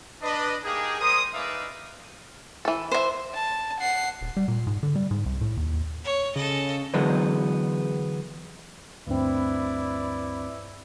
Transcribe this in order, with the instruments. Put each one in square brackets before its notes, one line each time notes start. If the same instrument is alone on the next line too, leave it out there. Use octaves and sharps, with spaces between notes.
[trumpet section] D4 B4 D#5
A#3 D#4 G4 G#4
G3 A#4 C5 D#6
G#3 D#4 B4 D5 E5 F5
[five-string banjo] E3 A4
[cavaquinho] C5 E5
[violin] A5
F#5 C7
[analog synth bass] D#1
G3
A#2
G#2
D3
G3
G#2
C2
A2
D#2
[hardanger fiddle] C#5
[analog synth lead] C#3 [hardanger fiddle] A4 D#5
[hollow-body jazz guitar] D3 E3 F#3 G#3 B3
[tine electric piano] D2 G2 C4 [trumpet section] E4 B4 D5